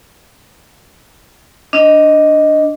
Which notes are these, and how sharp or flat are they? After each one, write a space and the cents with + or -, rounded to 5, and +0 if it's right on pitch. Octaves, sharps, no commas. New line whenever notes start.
D4 +0 D#5 +0